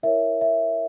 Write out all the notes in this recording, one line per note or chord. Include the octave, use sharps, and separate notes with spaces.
E4 A#4 C#5 E5
E5